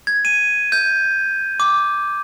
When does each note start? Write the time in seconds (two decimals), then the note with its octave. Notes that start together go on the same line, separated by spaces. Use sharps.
0.07 G#6
0.25 D#7
0.72 G6
1.60 D6